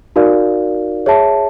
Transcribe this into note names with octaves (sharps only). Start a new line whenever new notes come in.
D#4 F#4 A#4 D5 F5
G#4 C#5 E5 A5